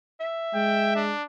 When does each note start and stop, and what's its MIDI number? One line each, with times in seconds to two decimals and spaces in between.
0.20 1.00 76
0.55 1.13 56
0.55 0.93 79
0.96 1.23 62